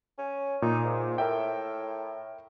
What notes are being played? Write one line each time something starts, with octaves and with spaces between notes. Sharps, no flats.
C#4
A#2 D#4
G#2
A2 A#4 E5 G5